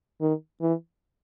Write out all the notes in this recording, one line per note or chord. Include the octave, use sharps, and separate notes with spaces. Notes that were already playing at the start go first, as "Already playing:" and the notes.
D#3
E3